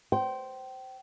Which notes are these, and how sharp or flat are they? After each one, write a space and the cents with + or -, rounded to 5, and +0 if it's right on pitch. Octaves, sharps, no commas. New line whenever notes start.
C5 +0 G5 -30